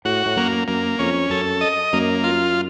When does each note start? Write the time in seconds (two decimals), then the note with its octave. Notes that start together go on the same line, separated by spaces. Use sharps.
0.05 A2 F#4
0.26 A2
0.36 F#2 A#3
0.68 F#2 A#3
0.99 F2 C#4
1.30 F#2 A4
1.61 D#5
1.93 F#2 A#3
2.24 F4